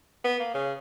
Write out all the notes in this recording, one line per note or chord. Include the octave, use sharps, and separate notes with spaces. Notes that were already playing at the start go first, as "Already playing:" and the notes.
B3
A#3
C#3